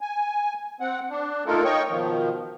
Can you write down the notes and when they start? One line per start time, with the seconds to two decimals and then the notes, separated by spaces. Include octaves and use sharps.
0.01 G#5
0.81 C4 F#5
1.10 D4
1.46 A3 A#3 D#4 F4 A4 A#4
1.64 C#5 D#5 G5 C#6
1.89 B2 D#3 F3